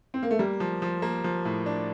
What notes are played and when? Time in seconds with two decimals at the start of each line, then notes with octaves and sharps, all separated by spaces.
0.14 C4
0.23 A#3
0.31 A3
0.39 G3 A#3
0.60 F3
0.82 F3
1.02 A#3
1.24 F3
1.45 A2
1.66 D4